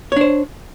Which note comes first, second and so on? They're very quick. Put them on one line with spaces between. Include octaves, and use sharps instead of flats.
C#5 D4 C5